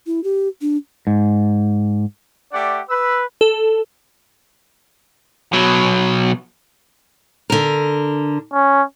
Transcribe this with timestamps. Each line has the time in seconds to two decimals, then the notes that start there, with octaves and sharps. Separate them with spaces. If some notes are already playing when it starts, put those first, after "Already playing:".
0.07 E4
0.24 G4
0.61 D4
1.07 G#2
2.53 A3 G4 D5 F#5
2.90 B4 E6
3.41 A4
5.53 B2 F#3
7.50 D3 A#4
8.53 C#4